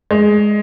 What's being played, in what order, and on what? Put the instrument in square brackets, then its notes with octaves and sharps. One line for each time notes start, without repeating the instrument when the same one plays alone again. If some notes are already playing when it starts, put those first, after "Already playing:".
[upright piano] G#3